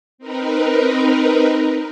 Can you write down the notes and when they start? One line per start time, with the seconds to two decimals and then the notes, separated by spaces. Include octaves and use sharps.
0.18 C4 D#4 A#4 B4